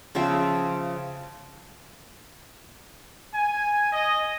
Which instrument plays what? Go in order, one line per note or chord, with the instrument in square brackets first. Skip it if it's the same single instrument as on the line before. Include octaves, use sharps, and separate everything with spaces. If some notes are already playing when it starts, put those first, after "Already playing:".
[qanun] C#3 F3 C4 E5
[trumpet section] G#5
D#5